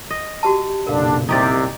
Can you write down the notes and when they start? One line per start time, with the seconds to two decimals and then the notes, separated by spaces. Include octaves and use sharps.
0.11 D#5
0.43 F#4 G4 A5
0.87 F#1 B1 A#2 D3 D4 A#4 F5
1.29 C2 C3 D#4 G4 D5